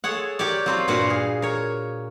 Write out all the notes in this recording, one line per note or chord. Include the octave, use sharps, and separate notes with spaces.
G#4 A4 C#5 F#5
G4 A#4 C#5 D5
F#3 C4 F4
G2 A#2 F#4 B4 F5 F#5
G#4
A#4 C#5